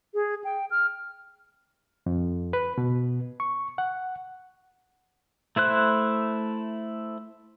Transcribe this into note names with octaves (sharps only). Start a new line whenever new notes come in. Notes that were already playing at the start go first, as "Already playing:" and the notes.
G#4
G5
F6
F2
B4
B2
C#6
F#5
A3 E4 C5 F#6